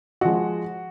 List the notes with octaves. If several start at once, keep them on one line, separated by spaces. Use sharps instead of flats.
F3 G#3 F#4